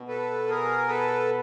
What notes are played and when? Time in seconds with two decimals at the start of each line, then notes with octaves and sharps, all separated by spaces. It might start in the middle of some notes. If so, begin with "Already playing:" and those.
Already playing: B2
0.08 A4 B4
0.49 G#4 A#4
0.88 A4 B4